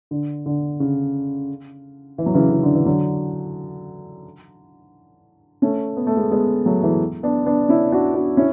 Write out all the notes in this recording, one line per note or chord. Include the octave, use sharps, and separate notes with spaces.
D3
D3
C#3
E3
F#3
C#3 E3
C#3
D3
E3
D3 F#3
A3 C#4
B3
A3
G#3 B3
G#3 B3
F#3 A3
E3 G#3
B3 D4
B3 D4
C#4 E4
D4 F#4
D4 F#4
C#4 E4